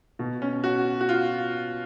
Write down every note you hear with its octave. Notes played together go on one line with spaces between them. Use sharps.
B2
C#4
F#4
F#4
F4